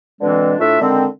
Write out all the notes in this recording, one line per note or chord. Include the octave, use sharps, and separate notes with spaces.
B2 D3 E3 G#3 C4 D4
A2 A3 D4 F4 E5
D3 D#3 G#3 C4